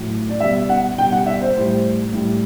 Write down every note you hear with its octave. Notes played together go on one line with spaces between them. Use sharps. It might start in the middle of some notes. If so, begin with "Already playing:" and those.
Already playing: A2 F#3
D5
B2 G3 E5
F#5
B2 G3 G5
F#5
E5
C5
A2 G3
A2 G3